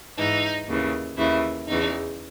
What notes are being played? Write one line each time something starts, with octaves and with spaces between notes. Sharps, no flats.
G#2 E3 D#4
D#2 C#3 E3
D#2 C#3 E3 E4
E2 C#3 E3 D#4